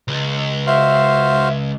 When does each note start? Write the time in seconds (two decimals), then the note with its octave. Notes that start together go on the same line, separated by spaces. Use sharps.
0.08 C#2
0.67 F#4 C5 E5 F5